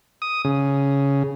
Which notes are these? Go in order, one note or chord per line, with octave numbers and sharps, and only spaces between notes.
D#6
C#3